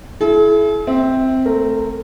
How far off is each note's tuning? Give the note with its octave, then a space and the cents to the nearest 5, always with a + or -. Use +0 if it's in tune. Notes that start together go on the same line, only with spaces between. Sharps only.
E4 +15 G#4 +45
C4 +0 E5 -15
A3 +5 A#4 -20